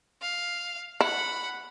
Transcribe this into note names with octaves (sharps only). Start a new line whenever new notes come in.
F5
E4 F#5 B5